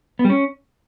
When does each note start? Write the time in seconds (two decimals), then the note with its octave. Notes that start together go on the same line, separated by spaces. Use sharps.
0.19 B3
0.25 G3
0.30 C#4